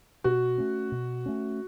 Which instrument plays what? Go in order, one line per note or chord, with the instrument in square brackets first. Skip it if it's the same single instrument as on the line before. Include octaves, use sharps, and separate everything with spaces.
[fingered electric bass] B2 [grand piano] F#4
[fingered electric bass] A3 C#4
B2
A3 C#4